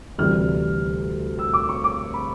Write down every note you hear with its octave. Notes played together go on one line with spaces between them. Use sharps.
D2 C3 E3 G3 F6
E6
D6
C#6
D6
B5